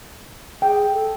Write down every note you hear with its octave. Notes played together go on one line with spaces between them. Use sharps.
G#4 G5
A4